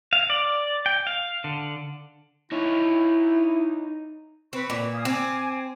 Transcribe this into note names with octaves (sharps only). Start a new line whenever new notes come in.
F5
D5
G5
F5
D3
D#4 E4 C#5
C4 B4 C#6
A#2
F5 G#5 D#6
C4 G#5 D6